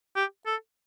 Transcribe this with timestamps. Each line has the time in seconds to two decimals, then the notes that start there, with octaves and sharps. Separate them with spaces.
0.15 G4
0.46 A4